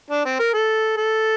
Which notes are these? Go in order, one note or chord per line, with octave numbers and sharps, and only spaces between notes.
D4
C4
A#4
A4
A4